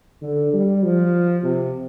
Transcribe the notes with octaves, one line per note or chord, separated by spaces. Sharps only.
D3
G3
F3
C3